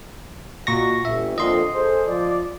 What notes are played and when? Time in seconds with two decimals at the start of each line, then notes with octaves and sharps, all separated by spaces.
0.67 A#2 F#4 D#5 C#6 A#6
1.05 G1 E5
1.38 F2 A#2 D3 D#5 C6
1.74 G#4 A4 C5
2.07 F3 D5